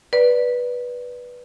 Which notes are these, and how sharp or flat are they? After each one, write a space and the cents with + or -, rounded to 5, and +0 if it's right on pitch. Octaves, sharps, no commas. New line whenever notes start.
B4 -10 D5 +0